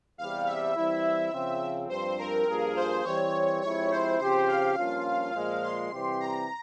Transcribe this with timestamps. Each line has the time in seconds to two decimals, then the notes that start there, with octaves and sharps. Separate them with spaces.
0.18 E2 C3 G3 F5
0.47 E5
0.75 E3 G3 C4 E4
1.33 C#3 F3 C4
1.89 G2 F3 C4 C5
2.19 A#4
2.47 G2 F3 A#3 F4 G#4
2.76 C5
3.05 E3 G3 C4 C#5
3.61 F3 G#3 C4 E4 G4 C#5
3.91 C5
4.19 C#3 F3 C4 G4 C5
4.48 F5
4.77 G2 F3 A#3 C#4 F4
5.33 A#2 F3 G#3
5.63 C6
5.91 C3 E3 G3 C4 G4
6.20 A#5